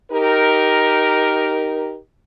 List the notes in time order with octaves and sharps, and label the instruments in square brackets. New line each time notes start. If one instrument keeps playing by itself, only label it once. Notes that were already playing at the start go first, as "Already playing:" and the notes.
[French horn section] D#4 G4 A#4